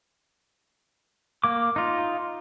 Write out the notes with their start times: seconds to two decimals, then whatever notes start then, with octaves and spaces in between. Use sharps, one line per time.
1.44 A#3 D6
1.76 D#4 F4